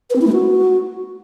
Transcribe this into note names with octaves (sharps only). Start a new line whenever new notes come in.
B4
C4
E4
A3
F#4